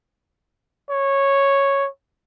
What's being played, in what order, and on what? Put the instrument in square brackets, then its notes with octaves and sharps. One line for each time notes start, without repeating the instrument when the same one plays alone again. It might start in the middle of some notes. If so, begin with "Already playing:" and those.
[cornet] C#5